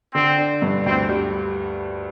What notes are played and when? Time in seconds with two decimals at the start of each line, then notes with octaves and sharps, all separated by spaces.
0.14 D3 C4
0.38 D4
0.62 G2
0.86 D2 C4
1.09 G3